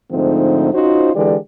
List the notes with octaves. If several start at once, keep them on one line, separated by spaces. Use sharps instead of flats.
G#2 D3 F3 A3 C4 D#4
C#4 D#4 F4 F#4 C5
D3 E3 G#3 G4 D5